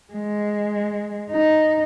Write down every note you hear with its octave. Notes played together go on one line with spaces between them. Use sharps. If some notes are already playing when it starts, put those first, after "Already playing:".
G#3
D#4